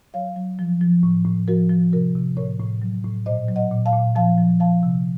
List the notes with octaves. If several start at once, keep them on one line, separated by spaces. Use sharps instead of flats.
F#3 C#5 F5
F#3
F3
F3
A2
A2
F3 F#4 A#4
F3
C3 F#4 A#4
C3
A2 A#4 C#5
A2
F#3
A2
A#2 C5 D#5
F#3
D#5 F#5
A#2
F5 A5
A#2
F3 F5 A5
F3
F3 F5 A5
C3